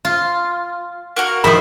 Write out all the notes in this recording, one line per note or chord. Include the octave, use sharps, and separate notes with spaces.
F4
A#3 F#4 A#4
D#3 F3 C5 E5 B5